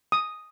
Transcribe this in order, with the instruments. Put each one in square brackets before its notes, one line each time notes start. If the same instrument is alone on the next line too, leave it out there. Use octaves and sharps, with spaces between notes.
[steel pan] D#6